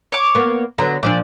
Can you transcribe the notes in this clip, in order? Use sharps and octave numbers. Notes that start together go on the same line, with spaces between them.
C#5 D6
A#3 B3
D3 F#3 B3 A#5
A#2 F3 D4 D5